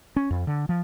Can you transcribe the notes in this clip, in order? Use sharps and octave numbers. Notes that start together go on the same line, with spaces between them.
C#4
F2
D3
F3